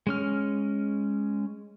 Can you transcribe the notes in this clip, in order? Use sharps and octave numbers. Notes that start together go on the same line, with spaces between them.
G#3 C#4 F6